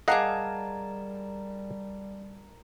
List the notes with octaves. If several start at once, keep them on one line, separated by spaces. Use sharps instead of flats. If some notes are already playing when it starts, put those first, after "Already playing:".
G3 G#4 A#4 D5 D#5 F5 F#5 A5